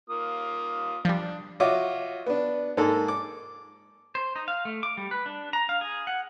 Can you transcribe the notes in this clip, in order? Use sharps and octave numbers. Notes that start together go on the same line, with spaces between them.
A#3 F4 D#6
F3 G3 D4
F4 F#4 C#5 D#5 E5 D6
B3 D4
G#2 G#3 A#3 A4
D6
C5
D#4
F5
A3
D6
G3
B4
D4
A#5
F5
G#4
F#5